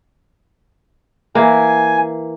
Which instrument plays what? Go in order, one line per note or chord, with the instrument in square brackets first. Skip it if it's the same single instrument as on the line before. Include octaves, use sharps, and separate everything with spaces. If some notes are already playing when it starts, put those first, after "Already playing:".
[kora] E3 A#3 [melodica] G#5